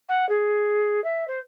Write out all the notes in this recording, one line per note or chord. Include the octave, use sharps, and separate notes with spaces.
F#5
G#4
E5
C5